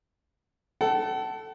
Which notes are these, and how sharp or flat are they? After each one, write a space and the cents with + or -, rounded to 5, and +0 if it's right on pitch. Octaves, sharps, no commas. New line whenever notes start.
A4 +0 F#5 +40